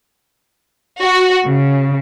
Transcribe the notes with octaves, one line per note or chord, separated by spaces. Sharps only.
F#4
C#3